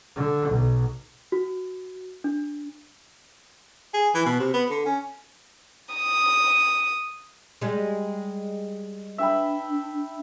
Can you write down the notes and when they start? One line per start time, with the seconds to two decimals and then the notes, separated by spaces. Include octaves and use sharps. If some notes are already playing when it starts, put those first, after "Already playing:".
0.16 D3
0.49 B1
1.32 F#4
2.24 D4
3.94 G#4
4.14 E3
4.26 B2
4.40 C3
4.54 B3
4.70 D3
4.86 C#4
5.95 D#6
7.61 G3 G#3
9.18 D4 E5 G5 B5